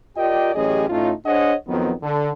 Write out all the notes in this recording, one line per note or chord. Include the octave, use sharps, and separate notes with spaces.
F4 G4 A#4 D5 D#5 G5
A1 F#2 C#4 G4 G#4 D#5
A2 A3 C#4 D#4 F4
D4 G#4 C5 C#5 D#5 F#5
F2 D#3 F#3 B3
D3